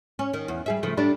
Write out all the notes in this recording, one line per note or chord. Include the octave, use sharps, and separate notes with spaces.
C#4
D#3
E2
G3 G#4 E5
C#3 F3 A3
G3 A3 D4